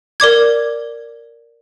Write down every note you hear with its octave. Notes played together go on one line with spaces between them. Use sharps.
A#4 D5 D6 G#6